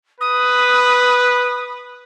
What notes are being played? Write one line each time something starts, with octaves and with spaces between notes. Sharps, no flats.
B4 D#6